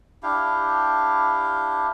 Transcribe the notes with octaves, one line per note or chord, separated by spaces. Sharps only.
D4 E4 G4 F5